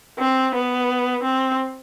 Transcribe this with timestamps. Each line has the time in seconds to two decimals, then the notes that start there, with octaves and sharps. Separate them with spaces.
0.20 C4
0.55 B3
1.23 C4